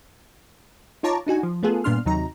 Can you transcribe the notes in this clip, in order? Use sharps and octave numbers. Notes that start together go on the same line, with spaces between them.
D#4 F4 C#5 A5 A#5 D6
D4 D#4 F#4 G#5
F3
A3 B3 F4 G#4 A4
G2 A#2 B3 D4 C6 F6
D#2 C3 F#3 D#4 A#5